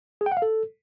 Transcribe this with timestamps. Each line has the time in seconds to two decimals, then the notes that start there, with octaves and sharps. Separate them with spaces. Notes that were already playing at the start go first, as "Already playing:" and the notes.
0.21 G#4
0.26 G5
0.32 F#5
0.37 F5
0.42 A4